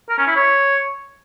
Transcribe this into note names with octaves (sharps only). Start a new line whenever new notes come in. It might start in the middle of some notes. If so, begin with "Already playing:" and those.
A#4
C#4
E4
C#5